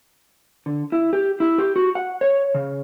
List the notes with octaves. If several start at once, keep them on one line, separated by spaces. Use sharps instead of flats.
D3
E4
G4
E4
G4
F#4
F#5
C#5
C#3